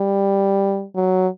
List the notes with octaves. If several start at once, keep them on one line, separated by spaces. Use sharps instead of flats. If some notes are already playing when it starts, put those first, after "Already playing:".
Already playing: G3
F#3